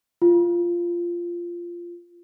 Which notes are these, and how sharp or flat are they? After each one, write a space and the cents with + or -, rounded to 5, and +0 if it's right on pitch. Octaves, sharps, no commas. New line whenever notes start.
F4 -10